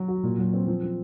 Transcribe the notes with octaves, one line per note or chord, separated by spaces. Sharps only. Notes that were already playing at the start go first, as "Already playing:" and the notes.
Already playing: F#3
F#4
A#2
F#3
C4
F3
F3